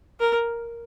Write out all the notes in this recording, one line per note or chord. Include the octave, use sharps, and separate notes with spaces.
A#4